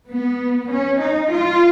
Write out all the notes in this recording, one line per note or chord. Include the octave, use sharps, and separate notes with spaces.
B3
C#4
D#4
F4